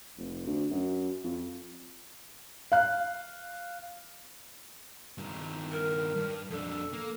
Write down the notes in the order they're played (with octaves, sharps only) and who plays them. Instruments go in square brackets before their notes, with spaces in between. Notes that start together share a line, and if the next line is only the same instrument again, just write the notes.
[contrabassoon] F1
D2
F#2
F2
[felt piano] F5 F#6
[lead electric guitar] G2 D#3
[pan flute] A#4
[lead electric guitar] G2
[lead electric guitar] F2 D4 [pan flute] A4
[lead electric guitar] A#3